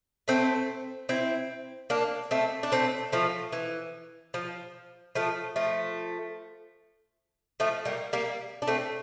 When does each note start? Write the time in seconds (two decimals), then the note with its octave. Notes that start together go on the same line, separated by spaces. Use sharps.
0.28 A3 C4
1.09 C4 E4
1.90 A#3 D4
2.31 A3 C4
2.63 D4
2.72 A3 C4
3.12 F3 A3
3.53 E3
4.34 F3
5.15 F3 A3
5.56 F3 A3
7.60 F3 A3
7.85 G3 A#3
8.13 G3 A#3
8.62 D4
8.67 A3 C4